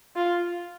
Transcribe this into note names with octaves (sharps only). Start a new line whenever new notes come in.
F4